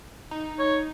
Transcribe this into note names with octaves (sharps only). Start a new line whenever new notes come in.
D#4
C#5